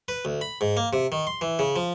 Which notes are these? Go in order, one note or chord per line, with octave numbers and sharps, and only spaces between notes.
B4
D2
B5
G#2
A#3
C3
D#3
C6
E3
C#3
F3